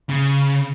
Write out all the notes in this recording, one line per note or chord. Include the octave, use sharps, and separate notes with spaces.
C#3